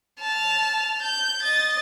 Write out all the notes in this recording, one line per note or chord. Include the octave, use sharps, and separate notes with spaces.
A5 F6
G6
D#5 A6